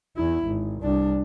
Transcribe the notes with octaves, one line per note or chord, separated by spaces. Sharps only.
E2 E4
G#1
C2 D4